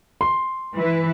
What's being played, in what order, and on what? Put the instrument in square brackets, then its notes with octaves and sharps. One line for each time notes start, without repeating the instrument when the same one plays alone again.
[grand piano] C6
[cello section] E3 E4 B4